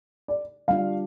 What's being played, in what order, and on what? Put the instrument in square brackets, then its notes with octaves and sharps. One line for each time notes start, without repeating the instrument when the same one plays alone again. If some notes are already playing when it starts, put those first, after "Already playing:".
[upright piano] D5
[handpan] G3 D4 F4 [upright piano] F5